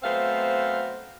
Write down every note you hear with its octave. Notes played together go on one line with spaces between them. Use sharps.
F#3 A3 B3 C4 C5 F5